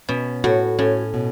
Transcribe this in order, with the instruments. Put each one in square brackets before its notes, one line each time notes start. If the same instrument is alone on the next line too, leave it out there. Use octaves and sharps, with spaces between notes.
[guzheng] B2 [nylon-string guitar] C#4
[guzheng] A2 [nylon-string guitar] F#4
[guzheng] A2 [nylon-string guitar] C#4
[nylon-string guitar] B2